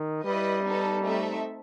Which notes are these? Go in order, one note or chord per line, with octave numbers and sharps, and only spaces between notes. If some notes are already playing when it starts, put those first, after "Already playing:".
Already playing: D#3
G3 E4 B4 D#5
B3 D#4 A4
A3 C4 D#4 A4 E5